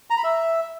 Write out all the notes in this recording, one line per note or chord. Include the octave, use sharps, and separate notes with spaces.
A#5
B5
E5